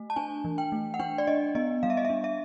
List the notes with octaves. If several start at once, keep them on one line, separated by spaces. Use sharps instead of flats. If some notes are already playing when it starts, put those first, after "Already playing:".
Already playing: A3
A5
D4 G#5
E3
G5
A3
F#5
D4 G5
D5
D4 D#5
B3 D#5
G3 F5
E5
D#5
E5
D4
E5